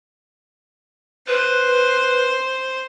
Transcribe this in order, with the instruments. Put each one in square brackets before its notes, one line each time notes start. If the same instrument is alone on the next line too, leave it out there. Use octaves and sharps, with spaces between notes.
[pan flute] B4 [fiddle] C5